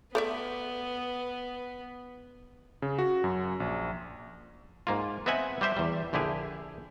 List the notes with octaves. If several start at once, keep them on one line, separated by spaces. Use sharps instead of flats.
A3 B3 D5 E5
C#3
F#4
F#2
A#1
G#2 A#3 F4
B3 C4 D#5 E5 F#5 G#5
G3 G4 C5 E5
E2 G3
A#1 D3 E4 G4 G#4